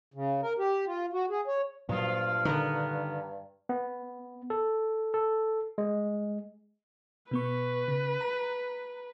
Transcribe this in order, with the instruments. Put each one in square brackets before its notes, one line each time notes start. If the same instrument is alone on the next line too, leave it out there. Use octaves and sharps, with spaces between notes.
[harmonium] C#3
A#4
G4
F4
F#4
G#4
C#5
[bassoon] G2 [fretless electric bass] A#2 F#3 [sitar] F3 F4
[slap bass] D3 D#3 [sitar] B3 A#4
[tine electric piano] B3
A4
A4
G#3
[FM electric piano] B2 B3 C#6 [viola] B4
[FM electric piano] C#3
A#5